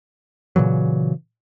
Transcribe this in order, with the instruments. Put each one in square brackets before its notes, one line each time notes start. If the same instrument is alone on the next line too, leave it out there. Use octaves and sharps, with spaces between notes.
[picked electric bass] A#2 C#3 E3 F#3